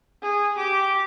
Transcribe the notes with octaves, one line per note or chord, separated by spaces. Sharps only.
G#4
G4 D6